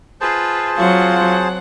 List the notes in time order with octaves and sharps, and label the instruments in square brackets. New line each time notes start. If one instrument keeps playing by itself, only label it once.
[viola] F4 B4 [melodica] G#4 C5 A5
[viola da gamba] F#3 [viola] C4 F#5 [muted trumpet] F4